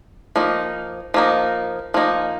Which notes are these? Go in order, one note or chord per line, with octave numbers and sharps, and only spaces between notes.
F3 A#3 D#4
F3 A#3 D#4
F3 A#3 D#4